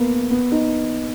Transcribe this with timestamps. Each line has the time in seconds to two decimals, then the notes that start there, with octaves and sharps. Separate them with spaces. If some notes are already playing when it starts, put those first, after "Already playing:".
Already playing: A#3 B3
0.31 B3
0.52 D#4